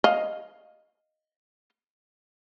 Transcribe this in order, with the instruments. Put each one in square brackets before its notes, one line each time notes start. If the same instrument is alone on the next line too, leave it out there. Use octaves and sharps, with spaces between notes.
[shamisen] D#5 F5